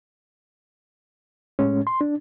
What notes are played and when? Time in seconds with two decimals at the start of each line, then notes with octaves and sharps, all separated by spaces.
1.59 A2 G#3 C#4
1.87 C6
2.01 D4